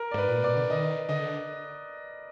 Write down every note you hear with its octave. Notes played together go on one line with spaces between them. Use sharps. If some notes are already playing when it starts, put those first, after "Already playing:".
Already playing: A#4
D5
G#2 B4
A#2
B2 D5
D3
D#3 D#5
D3 D#5